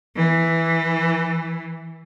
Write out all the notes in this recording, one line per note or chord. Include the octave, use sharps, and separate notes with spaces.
E3